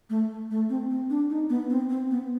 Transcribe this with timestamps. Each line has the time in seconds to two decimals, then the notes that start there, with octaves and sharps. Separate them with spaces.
0.10 A3
0.51 A3
0.69 C4
0.90 C4
1.10 D4
1.30 D#4
1.50 B3
1.70 C4
1.89 C4
2.11 B3